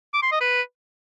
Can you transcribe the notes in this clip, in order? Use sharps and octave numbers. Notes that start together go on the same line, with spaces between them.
D6
C6
D#5
B4